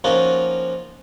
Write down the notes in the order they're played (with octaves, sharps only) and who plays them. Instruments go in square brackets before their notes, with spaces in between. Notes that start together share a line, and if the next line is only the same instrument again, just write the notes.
[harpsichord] F3 A#3 C#4 D#4 F4 F#4